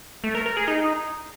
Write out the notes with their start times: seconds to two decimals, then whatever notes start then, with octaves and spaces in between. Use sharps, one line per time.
0.24 A3
0.35 A#4
0.46 A#4
0.57 G#4
0.68 D#4